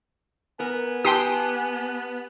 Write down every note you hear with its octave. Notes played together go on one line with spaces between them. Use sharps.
B3 A#4 G#5
G4 G5 A5 C6 D#6